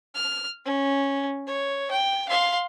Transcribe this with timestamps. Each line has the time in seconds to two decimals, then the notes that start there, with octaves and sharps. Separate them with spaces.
0.15 F6
0.65 C#4
1.47 C#5
1.91 G5
2.28 F5 C6